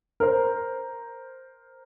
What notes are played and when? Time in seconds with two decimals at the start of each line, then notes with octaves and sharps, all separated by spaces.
0.20 A#4 C5